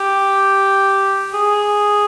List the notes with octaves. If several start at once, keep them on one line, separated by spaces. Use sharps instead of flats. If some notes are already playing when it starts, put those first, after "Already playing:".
Already playing: G4
G#4